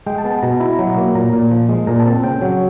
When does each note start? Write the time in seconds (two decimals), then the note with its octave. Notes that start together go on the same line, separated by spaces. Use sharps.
0.06 G#3 G5
0.18 A5
0.25 B3
0.31 A5
0.43 B2 A#5
0.60 E4 A#5
0.79 F#3
0.97 A#3
1.15 A#2 A#5
1.33 A#2
1.51 F3
1.69 G#3
1.87 A#2 A#5
2.00 A5
2.05 C4
2.23 C#3 G5
2.41 F#3